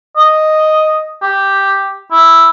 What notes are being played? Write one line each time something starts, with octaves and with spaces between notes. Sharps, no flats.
D#5
G4
E4